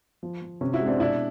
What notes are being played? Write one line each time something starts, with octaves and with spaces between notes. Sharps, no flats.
F3
F3
C3 C#4
E4 F#4
G#3
C4 D4
B2 D4 E4